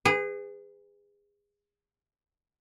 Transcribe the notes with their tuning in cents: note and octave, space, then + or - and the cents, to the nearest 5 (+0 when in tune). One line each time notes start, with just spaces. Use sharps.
G#4 -25 B4 +30